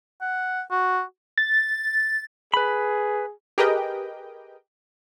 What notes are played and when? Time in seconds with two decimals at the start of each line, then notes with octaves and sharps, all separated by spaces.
0.21 F#5
0.71 F#4
1.38 A6
2.54 G#4 B4 B5
3.58 G4 G#4 A#4 B4 D#5 G5